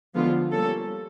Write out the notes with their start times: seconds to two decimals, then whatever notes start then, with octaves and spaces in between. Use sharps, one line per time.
0.14 D3 F3 G#3 B3 F4
0.52 G3 A#3 C#4 A4